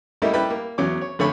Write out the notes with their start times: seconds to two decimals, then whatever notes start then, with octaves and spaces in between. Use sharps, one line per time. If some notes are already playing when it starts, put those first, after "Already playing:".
0.22 G3 A3 A#3 D#4 E4
0.34 G3 E4 G4 B4
0.50 A#3
0.78 E2 F#3 C#4 D6
1.01 C#5
1.19 F2 D3 A3 C#5 B5